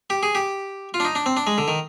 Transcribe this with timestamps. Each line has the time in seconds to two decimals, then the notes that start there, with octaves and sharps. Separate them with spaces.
0.10 G4
0.23 G#4
0.35 G4
0.94 F4
1.00 D4
1.05 D#4
1.15 D4
1.26 C4
1.37 D4
1.47 G#3
1.58 D3
1.68 D#3